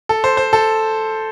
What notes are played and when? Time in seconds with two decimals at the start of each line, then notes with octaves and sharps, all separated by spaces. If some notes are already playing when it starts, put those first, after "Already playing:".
0.09 A4
0.24 C5
0.37 C5
0.53 A4